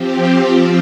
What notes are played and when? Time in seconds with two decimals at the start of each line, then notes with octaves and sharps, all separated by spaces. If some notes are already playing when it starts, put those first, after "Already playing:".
Already playing: F3 C4 G4
0.48 F3 C4 F4